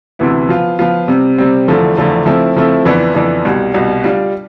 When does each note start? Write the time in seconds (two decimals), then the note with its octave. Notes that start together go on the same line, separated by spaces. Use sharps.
0.19 D2 C3 E3 B3 E4
0.49 F3 B3 F4
0.79 F3 B3 F4
1.08 C3 G3 C4
1.38 C3 G3 C4
1.68 E2 D3 F3 A3
1.97 E2 D3 F3 A3
2.26 F3 A3 C4 E4
2.57 F3 A3 C4 E4
2.85 F2 E3 B3 D4
3.15 F2 E3 B3 D4
3.45 C2 B2 G3
3.74 C2 B2 G3
4.04 G3 D4 F4